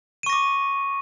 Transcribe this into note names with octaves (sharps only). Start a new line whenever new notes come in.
C#6 D6 A#6 D#7